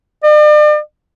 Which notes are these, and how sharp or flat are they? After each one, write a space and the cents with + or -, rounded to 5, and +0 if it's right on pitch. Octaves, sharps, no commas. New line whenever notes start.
D5 +40